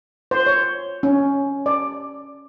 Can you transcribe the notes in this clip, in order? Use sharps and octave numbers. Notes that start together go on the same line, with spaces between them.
C5
C#5
C#4
D5